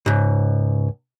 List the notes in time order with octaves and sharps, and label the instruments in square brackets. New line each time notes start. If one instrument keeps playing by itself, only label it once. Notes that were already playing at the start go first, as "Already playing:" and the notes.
[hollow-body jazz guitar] C#2 G#2